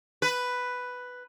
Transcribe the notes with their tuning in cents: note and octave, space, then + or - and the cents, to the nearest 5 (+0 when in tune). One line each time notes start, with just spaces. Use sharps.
B4 +5